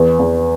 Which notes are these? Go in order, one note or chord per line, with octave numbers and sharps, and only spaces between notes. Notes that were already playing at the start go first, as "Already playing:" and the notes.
Already playing: E2 B4
E2